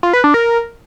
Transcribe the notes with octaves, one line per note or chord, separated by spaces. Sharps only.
F4
B4
D4
A#4